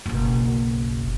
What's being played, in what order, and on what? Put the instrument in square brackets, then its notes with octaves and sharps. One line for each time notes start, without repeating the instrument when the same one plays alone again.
[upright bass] F#1 B1